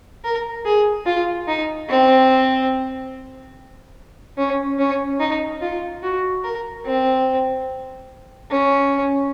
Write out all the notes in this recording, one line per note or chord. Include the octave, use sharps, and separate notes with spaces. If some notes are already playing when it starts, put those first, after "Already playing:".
A#4
G#4
F4
D#4
C4
C#4
C#4
D#4
F4
F#4
A#4
C4
C#4